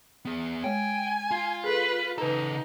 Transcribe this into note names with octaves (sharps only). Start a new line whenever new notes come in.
B3 G#4
G#3 C#5 G5 G#5
F4
G#4 A4 B4
C#3 D#4 A4 B4 A#5